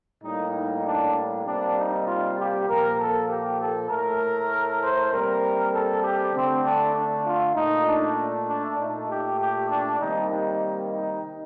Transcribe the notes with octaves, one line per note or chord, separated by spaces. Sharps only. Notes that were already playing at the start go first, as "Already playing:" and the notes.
A2 G3 A#3 D#4
D#4
D4
C3 G3 A#3 D4
D#4
F4
G4
A#2 F3 A#3 A#4
A4
G4
A4
A2 A3 A#4
C5
C3 G3 A#3 A#4
A4
G4
D3 A3 C4
D4
D4
F4
A#2 A3 D#4
D4
D4
A#2 A3 D#4
G4
G4
D4
C3 D#3 G3 A#3 D#4
D#4
D#4